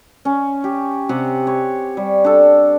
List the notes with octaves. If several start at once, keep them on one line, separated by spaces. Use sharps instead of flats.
C#4
G4
C3 G4 F#5
C#5
G3
D4 A4